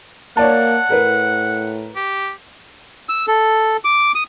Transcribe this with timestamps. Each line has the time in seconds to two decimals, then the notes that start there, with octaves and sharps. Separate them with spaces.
0.37 A#3 C#5 D5 F#5 A5
0.90 A2 A#4 B4
1.96 G4
3.09 E6
3.28 A4
3.85 D6
4.15 D#6